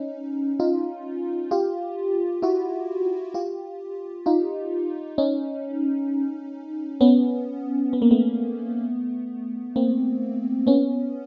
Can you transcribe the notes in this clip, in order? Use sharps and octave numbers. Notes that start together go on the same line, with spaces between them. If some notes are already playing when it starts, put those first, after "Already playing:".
Already playing: C#4 D#4
D#4 F4
F4 G4
E4 F#4
F4 G4
D#4 F4
C#4 D#4
B3 C#4
B3
A#3
A3 B3
A#3 C4
B3 C#4